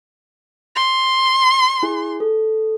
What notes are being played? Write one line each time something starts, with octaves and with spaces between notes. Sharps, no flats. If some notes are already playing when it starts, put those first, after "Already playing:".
C6
E4 G#4 G#5
A4